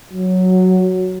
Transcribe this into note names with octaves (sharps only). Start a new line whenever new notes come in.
F#3